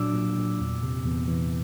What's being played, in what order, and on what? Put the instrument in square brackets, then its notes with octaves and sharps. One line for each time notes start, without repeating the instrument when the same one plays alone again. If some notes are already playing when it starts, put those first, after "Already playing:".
Already playing: [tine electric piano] A#2 F#3 D4 D6 E6
A#2
A#2
E2
C3
E2
E3